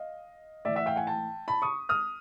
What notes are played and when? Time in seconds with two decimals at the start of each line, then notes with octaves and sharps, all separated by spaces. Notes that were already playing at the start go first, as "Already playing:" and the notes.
Already playing: D#5 F5
0.65 A2 E3 D5 E5
0.76 E5 F#5
0.86 F5 G5
0.96 F#5 G#5
1.07 G5 A5
1.48 A5 B5
1.62 C#6 D#6
1.89 D#6 F6